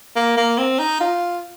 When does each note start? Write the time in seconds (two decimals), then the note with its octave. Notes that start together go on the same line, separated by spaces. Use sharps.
0.16 A#3
0.37 A#3
0.58 C4
0.79 D#4
1.01 F4